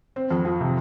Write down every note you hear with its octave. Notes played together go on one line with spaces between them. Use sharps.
C4
F2
F3
C3